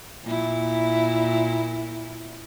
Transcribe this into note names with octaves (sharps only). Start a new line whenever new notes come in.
A#2 E4